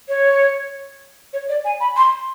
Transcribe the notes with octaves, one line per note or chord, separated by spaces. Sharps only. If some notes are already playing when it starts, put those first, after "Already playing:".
C#5
C#5
D5
G#5
B5
C6